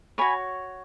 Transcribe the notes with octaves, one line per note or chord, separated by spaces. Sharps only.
F#4 C#5 G#5 B5